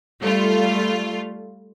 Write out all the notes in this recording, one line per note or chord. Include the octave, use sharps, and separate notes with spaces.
G3 A3 F4